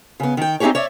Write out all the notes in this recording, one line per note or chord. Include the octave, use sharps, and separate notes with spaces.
C#3 B3
D#3 G5
C4 D#4 F4 G4 G#4 C#5
C#5 D5 E5